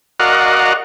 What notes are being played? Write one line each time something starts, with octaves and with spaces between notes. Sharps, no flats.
F#4 A#4 D5 D#5 F5 F#5